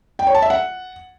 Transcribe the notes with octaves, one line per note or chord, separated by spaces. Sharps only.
G5
C#5
A5
E5
F#5